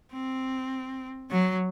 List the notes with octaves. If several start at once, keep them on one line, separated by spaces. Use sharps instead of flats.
C4
F#3